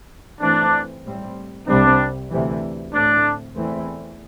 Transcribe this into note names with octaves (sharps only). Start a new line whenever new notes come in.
G2 E3 A3 C4 D4
A2 G3 C4
C2 C3 G3 C4 D4
D2 C3 E3
A2 A3 C4 D4
E2 E3 A3 C4